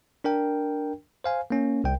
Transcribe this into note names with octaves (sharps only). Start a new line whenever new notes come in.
D4 A#4 G5
C5 F5 G#5
A#3 C#4
C2 G5